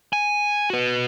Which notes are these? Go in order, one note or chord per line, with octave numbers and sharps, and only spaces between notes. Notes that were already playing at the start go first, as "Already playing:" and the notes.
G#5
F#4 B4